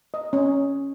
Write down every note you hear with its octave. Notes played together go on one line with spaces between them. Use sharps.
D#5
C#4